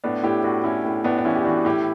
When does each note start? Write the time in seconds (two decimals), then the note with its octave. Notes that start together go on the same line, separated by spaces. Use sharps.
0.04 A2 B3 D4
0.23 A2 E4 G4
0.44 A2 D4 F#4
0.64 A2 C#4 E4
0.85 A2
1.04 A2 B3 D4
1.18 D4
1.25 E3 C#4 E4
1.36 G4
1.45 E3 D4 F#4
1.65 A2 E4 G4